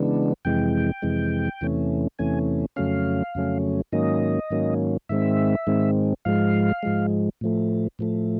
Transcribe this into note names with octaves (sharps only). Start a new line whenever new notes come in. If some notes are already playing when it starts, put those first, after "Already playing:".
Already playing: C#3 E3 G#3 B3 D4
F2 C3 E3 G#3 G5
F2 C3 E3 G#3
E2 C3 E3 A3 C#4
E2 C3 E3 A3 C#4 G#5
F2 C#3 F#3 A3 C#4 F5
F2 C#3 F#3 A3 C#4
G#2 D#3 F#3 A#3 C#4 D#5
G#2 D#3 F#3 A#3 C#4
G#2 D#3 G#3 C4 E5
G#2 D#3 G#3 C4
G#2 F3 G#3 F5
G#2 F3 G#3
A2 F3 A3
A2 F3 A3